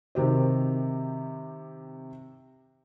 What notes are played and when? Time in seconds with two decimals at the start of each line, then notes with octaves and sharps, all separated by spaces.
0.15 C3 D#3 G4 C5